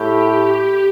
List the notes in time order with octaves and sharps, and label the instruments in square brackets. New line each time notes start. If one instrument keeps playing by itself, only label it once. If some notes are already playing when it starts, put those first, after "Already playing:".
Already playing: [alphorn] A2 [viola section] G4